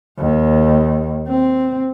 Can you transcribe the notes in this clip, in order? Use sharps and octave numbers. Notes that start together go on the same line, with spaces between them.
D#2
C4